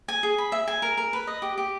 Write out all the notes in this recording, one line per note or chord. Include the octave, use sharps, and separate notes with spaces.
G#5
G#4
B5
E5
G#5
A#4
A#4
B4
D#5
G4
G4